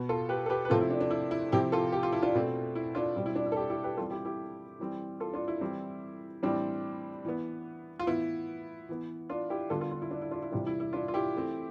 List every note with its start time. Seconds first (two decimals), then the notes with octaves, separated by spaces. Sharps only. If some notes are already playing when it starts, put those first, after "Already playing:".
Already playing: B2 B3
0.09 F4 A4
0.29 G4 B4
0.46 A4
0.49 G4 B4
0.65 B4
0.70 C3 F3 A3 C4 F4 A4
0.81 E4
0.90 D4
1.01 D4
1.11 E4
1.31 E4
1.52 C3 F3 C4 E4 G4
1.72 F4 A4
1.92 G4
2.03 F4
2.12 E4
2.22 D4 F4
2.34 B2 A3 C4
2.75 E4
2.95 D4 F4
3.16 B2 G3 C4
3.26 E4
3.36 D4
3.46 E4
3.52 A4
3.56 E4 G4
3.70 E4 G4
3.83 G4 B4
3.97 E3 G3 C4 F4 A4
4.11 E4 G4
4.25 E4 G4
4.79 E3 G3 C4
5.20 F4 A4
5.34 D4 F4
5.48 E4
5.61 E3 G3 C4
6.43 A2 E3 G3 C4 D4
7.25 E3 B3
7.99 F4
8.07 A2 E3 B3 E4
8.89 E3 B3
9.30 D4 F4
9.50 E4 G4
9.70 D3 G3 B3 F4 A4
9.80 F4 A4
9.91 D4 F4
10.02 E4
10.11 D4
10.22 E4
10.31 D4 F4
10.42 E4
10.52 C3 E3 G3 D4 F4
10.67 E4
10.80 E4
10.93 D4 F4
11.08 F4
11.14 E4 G4
11.35 E3 A3 C4